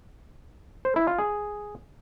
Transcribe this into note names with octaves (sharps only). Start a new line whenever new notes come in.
C5
E4
F4
G#4